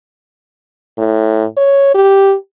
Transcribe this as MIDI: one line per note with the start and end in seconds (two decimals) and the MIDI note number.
0.98 1.45 45
1.57 1.91 73
1.95 2.35 67